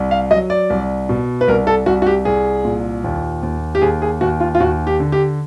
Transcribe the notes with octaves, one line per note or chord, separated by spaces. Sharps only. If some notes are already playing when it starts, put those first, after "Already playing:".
Already playing: C2
F5
F#3 D#5
D5
C2
B2
B4
C2 A#4
A4
C2 F#4
F#4
G4
C2 G#4
A#2
D#2
D#2
G4
D#2 G#4
G#4
D#2 F#4
F4
F4
D#2 F#4
G4
D3
G4